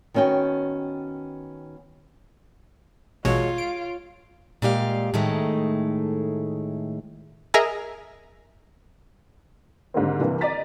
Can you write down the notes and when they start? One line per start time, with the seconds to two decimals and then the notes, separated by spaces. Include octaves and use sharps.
0.14 D#3 B3 C#4 F#4 G5
3.25 A1 B2 F#3 G#3 F4 C#5
3.58 D7
4.62 A#2 G#3 G4 F5
5.14 A2 D#3 G#3 A3
7.54 G#4 A#4 D#5 E5 G#5 A#5
9.94 G#2 D3 D#3 G3 A#3 C4
10.20 G2 C3 E3 A#3
10.41 D5 D#5 A#5 A6 B6